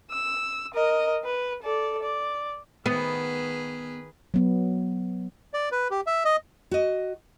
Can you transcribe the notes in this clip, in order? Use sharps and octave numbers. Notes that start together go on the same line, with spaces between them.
E6
A#4 D#5
B4
A4 D5
D5
D#3 B3 G#4 B4
F#3 B3
D5
B4
G4
E5
D#5
F#4 D#5